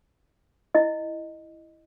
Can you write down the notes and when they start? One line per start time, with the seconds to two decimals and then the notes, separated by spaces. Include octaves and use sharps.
0.75 E4 D#5